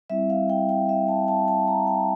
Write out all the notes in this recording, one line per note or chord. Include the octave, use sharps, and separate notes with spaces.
G3 C4 E4 E5
F5
G5
G5
E5
A5
A5
A5
A#5
G5